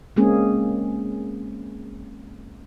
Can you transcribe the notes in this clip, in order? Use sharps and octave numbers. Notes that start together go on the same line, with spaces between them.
G#3 A#3 C4 C#4 G#4